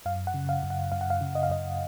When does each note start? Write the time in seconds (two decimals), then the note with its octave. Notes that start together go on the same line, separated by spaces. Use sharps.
0.06 F#2 F5
0.27 F#5
0.34 C#3
0.49 F5
0.63 F#2
0.70 F#5
0.92 F#2 F5
1.01 F#5
1.10 F5
1.21 C#3
1.35 D#5
1.43 F5
1.50 F#2 D#5